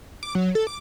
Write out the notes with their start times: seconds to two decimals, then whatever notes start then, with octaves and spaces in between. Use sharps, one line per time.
0.23 D6
0.35 F#3
0.55 A4
0.67 D6